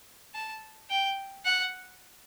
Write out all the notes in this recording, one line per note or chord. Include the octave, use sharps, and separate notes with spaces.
A5
G5
F#5